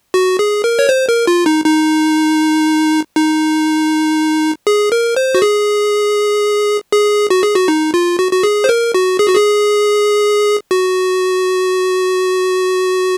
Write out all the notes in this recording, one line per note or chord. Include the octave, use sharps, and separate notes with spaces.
F#4
G#4
A#4
C#5
C5
A#4
F4
D#4
D#4
D#4
G#4
A#4
C5
F#4
G#4
G#4
F#4
G#4
F#4
D#4
F4
F#4
F#4
G#4
C5
A#4
F#4
G#4
F#4
G#4
F#4